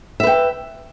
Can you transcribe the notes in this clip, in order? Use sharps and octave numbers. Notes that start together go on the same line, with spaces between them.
B4 E5 G5